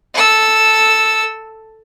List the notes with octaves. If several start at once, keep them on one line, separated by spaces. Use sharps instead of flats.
A4 E6